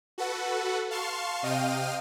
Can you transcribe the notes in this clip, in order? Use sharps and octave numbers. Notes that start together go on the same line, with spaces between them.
F#4 A4 B4 F#5
F5 A5 C6 C#6
C3 D#5 F5 G5 F6 D#7